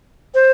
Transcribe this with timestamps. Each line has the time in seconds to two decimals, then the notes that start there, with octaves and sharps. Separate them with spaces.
0.35 C5